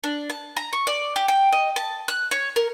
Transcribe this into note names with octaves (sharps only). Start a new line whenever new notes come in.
D4
A5
A#5
C#6
D5
G4
G5
D#5
A5
F#6
C#5
A#4